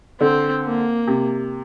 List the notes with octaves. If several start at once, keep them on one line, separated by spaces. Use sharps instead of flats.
D3 C4
A#3
C3